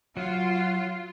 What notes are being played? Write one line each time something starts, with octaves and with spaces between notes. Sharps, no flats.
F#3 F4